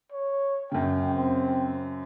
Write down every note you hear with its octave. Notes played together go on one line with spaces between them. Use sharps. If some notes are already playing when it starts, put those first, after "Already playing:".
C#5
F#2 C#3 G5
C4